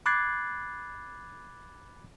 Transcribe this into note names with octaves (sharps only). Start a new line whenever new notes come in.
B5 D6 F#6 G#6 A6 C7